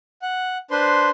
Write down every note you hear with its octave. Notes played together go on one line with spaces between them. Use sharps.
F#5
D4 B4 C5 C6